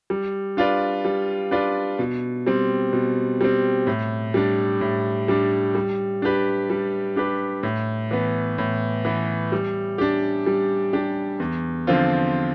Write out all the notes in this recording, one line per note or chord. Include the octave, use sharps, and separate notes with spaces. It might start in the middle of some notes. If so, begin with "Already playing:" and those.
G3
D4 F4 B4 D5
G3
D4 F4 B4 D5
B2
G3 C4
B2
G3 C4
A2
G3 D4
A2
G3 D4
G3
D4 G4 B4
G3
D4 G4 B4
A2
E3 B3
A2
E3 B3
G3
D4 G4
G3
D4 G4
E2
D3 F3 C4 F4